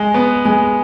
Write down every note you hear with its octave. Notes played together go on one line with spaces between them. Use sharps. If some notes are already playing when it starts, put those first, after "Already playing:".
Already playing: G#3
B3
G#3